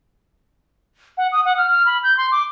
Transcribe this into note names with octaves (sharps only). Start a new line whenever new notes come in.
F#5
D#6
F#5
F6
F6
B5
G6
C6
D6